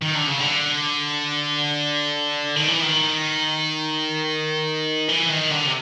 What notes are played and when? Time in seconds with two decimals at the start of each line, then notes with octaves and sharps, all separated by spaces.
0.02 D#3
0.15 D3
0.27 C#3
0.40 D3
2.56 D#3
2.68 E3
2.82 D#3
5.09 E3
5.30 D#3
5.51 D3
5.66 C3